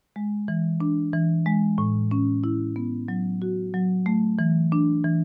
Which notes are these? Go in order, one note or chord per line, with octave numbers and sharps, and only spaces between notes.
G#3
E3
D4
E3
G#3
A2
C#4
E4
B3
F#3
F#4
F#3
A3
E3
D4
E3